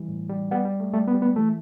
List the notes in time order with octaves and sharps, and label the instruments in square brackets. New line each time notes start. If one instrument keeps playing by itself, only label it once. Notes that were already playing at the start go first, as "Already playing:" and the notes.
Already playing: [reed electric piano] E3 G3
A2
G3
[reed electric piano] G3 [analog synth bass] B3
[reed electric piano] G3
A3
[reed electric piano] G3 [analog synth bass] A3
[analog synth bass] B3
[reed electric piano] G3
[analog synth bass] B3
[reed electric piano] E3 [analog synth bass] A3